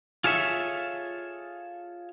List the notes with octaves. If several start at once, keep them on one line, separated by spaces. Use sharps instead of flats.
F4 G#4 A4 C#5 E5